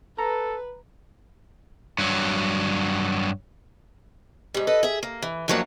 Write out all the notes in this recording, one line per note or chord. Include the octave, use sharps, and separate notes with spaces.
A4 B4 A#5
G2 F#3
G#2 G3
A4 B4 D#5
G#4 E5
A#3
E3
F2 F3 F#3 A3 A#3 D4